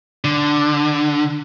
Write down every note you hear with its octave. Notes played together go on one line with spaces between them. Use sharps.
D3